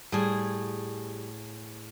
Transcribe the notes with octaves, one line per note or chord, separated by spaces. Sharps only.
A2 G3 G#4